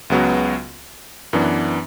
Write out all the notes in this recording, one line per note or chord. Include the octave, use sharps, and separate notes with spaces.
C#2 C#3 F#3 B3 F#4
F#2 E3 B3 D4